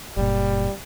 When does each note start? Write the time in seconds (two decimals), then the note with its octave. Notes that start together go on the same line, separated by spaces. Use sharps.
0.17 F#1 A#2 G3